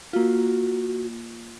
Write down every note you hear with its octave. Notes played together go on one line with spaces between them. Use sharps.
A#3 F4 F#4